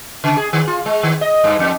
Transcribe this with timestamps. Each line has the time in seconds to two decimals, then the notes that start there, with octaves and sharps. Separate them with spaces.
0.24 C#3
0.37 G#4
0.53 D#3
0.67 F4
0.86 G#3
1.03 D#3
1.21 D#5
1.44 G2
1.59 F2